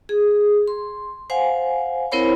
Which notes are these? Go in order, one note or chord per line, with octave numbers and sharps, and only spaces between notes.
G#4
C6
C5 F5 F#5 G#5
C4 E4 A#4 C5 C#5 B5